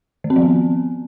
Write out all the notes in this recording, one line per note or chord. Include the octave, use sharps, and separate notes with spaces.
D#3
C4
F3
B3